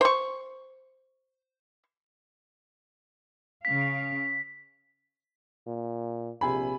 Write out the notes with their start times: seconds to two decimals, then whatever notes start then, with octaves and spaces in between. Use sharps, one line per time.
0.01 C5 C#6
3.65 C#3 F5 B6
5.66 A#2
6.41 A#1 C3 G#4 B5